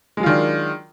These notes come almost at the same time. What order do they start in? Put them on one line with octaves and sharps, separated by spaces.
G#3 F#3 F4 D#3 D4